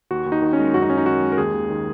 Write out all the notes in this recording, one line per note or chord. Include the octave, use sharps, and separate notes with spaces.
D#2 F#4
D#2
D#4
D#3
C#4
G#3
F#2 F#4
D#4
F#2 C#4
D#4
D#3 F#4
G#3
A#4
D#2 G#4
D#2
D#3